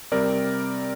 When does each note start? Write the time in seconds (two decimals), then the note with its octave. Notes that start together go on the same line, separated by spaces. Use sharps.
0.12 C3 G3 C4 A#4 D5